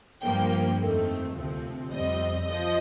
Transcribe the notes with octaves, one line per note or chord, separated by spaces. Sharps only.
G2 F3 A#3 G5
F2 D#3 A3 C4
D2 C3 F3 C4
F2 C3 G3 C4 D#5
F3 D#5